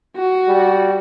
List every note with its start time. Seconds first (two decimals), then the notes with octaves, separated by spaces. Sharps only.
0.17 F#4
0.48 G3